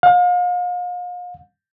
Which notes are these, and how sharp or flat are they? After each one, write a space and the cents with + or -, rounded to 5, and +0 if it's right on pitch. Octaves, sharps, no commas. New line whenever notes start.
F5 +40